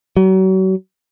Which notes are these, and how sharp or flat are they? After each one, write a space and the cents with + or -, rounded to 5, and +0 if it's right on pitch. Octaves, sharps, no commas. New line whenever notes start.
F#3 +35